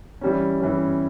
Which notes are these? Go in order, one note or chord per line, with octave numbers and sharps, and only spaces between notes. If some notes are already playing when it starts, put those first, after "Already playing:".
E3 G3 C#4
E3 G3 C#4